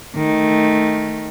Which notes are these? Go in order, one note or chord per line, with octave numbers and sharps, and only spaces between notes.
D#3 A3